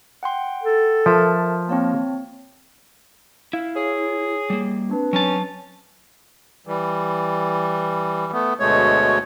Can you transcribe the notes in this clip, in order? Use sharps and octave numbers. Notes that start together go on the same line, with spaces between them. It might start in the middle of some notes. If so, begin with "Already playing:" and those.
F#5 G5 C6
A4
F3 A#4 E5 A5
A#3 C4 C#5 A5
E4 F5
G#4 C#5
G3 A#3
C4 D4 B4
F#3 C#4 A5
E3 G3
A3 B3
D2 B2 G#3 A3 C#5